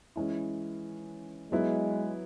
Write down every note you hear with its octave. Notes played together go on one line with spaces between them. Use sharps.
E3 G#3 C#4 E4
F#3 G#3 B3 E4